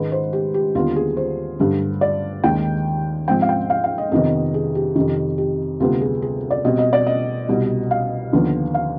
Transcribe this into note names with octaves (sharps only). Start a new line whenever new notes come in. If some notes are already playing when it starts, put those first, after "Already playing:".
Already playing: G#2 D#3 G#3 B4
C5
G4
G4
D#2 D3 G3 B3 F4
G#4
C5
G2 D3 G3
D5
D#2 D#3 G#3 G5
G#2 F3 C4 G5
F5
G5
F5
F5
D#5
F2 C3 D#3 B3 D#5
G#4
G4
F2 C3 D#3 G4
G4
D2 C3 G3 B3 F4
G#4
G#4
D5
B2 G3 C4 D#5
D#5
D5
D#5
C2 B2 G3
F5
D#2 D3 F3 B3
F5